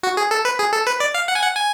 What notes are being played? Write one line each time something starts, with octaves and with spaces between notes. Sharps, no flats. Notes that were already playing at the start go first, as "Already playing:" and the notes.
F#4
G#4
A4
B4
G#4
A4
B4
D5
F5
F#5
G#5
F#5
G#5